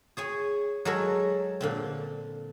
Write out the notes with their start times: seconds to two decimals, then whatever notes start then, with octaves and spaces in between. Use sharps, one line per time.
0.17 G#4 C#5 G#5
0.85 F#3 G#3 A4 A#4 C#5
1.61 A#2 D3 C4